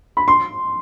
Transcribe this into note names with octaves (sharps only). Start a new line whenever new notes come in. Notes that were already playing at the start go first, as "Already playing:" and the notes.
B5
C6